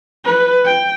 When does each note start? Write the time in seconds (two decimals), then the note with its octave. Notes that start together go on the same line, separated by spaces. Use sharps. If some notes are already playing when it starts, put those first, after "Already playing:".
0.25 B4
0.65 G5